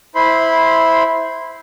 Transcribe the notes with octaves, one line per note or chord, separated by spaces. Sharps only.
E4 C5 B5 C6